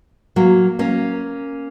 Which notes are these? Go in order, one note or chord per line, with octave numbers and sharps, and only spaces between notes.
F#3 A#3
A#3 C#4